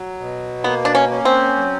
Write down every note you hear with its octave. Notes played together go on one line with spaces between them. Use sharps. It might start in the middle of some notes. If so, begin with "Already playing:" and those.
Already playing: F#3
B2
A#3 B3
D4
C#4
C#4
C4
F#3